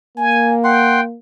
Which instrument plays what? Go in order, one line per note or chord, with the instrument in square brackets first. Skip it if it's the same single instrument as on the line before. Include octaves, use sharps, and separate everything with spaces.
[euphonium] A#3 [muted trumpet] G#5
[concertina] F#5 C6 [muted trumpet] G5